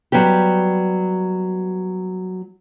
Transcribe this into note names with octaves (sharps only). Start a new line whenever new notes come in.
F#3 G3 B3 G4